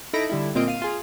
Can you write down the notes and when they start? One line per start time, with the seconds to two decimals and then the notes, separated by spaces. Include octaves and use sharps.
0.13 D#4 E4 A4 B5 A#6 D7
0.30 D3 G3 E4
0.55 A#2 A#3 C4 F4 D#5 D7
0.68 F5 D#7
0.82 F4 G#4